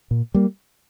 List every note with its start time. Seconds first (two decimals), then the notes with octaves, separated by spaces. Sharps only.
0.11 A#2
0.34 G3 A#3